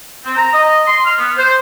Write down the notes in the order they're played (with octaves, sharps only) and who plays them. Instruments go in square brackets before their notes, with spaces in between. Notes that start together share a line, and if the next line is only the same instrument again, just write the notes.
[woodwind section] C4
A#5
D#5
C6
F6
B3
C5